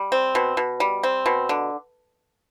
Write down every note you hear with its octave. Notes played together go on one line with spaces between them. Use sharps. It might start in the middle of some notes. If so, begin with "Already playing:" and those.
Already playing: G3
C4
B2
B2
G3
C4
B2
D3